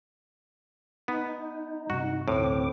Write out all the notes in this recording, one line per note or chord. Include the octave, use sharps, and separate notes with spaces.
B3 D#4
G2 C3 F#4
D2 A2 C4 D6